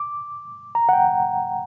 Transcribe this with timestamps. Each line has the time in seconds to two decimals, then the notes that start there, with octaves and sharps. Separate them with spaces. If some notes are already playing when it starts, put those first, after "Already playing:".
Already playing: D6
0.75 A#5
0.89 F#5
0.93 G5